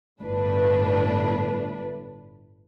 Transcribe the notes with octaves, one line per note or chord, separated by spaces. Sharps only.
G1 A2 D4 B4